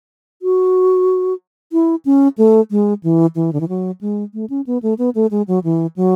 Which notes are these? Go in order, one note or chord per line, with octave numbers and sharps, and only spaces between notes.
F#4
E4
C#4
A3
G#3
E3
E3
D3
E3
F#3
G#3
A3
C#4
B3
A3
B3
A3
G#3
F#3
E3
F#3